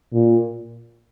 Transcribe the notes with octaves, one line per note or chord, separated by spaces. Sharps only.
A#2